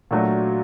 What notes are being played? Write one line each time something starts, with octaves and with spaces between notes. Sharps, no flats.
A#2 F#3 A3 D4 F#4